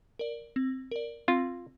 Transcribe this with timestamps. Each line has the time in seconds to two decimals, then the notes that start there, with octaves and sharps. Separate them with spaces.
0.19 A#4 D5
0.56 C4
0.91 A#4 D5
1.28 C4 F4